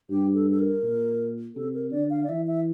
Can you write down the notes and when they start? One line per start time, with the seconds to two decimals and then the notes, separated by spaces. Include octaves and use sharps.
0.10 G2 G4
0.34 A4
0.51 A4
0.59 A#4
0.83 A#2
1.56 C3 A4
1.74 A#4
1.91 D3 D5
2.10 F5
2.24 D5
2.29 E3 E5
2.47 E5